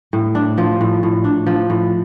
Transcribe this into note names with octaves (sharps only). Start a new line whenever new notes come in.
A2
D4
F3
A2
A2
D4
F3
A2